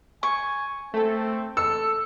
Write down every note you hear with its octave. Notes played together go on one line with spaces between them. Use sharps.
G#5 C#6
A3 C4 A4
A4 E6 C#7